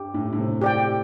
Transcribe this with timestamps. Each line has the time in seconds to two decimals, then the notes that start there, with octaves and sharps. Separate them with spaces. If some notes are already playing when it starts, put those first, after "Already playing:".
Already playing: G2 G4
0.14 A2
0.33 A2
0.38 C3
0.61 G4 D5 G5